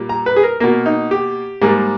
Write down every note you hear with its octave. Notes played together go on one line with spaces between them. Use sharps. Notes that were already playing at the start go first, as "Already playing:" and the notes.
Already playing: A#2 G3 A#3
A#5
B4
G#4
A#4
B2 A#3 A#4
D#4
G4
G#2 G3 A#3